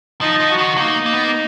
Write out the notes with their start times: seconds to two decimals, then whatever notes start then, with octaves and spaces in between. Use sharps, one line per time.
0.21 F3 D#4
0.40 F3
0.50 F#4
0.59 D#3
0.78 A#3 D#4
1.06 A#3
1.14 B3
1.24 A#3